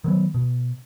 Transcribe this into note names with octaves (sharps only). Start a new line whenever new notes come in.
D#3 F#3 B3
B2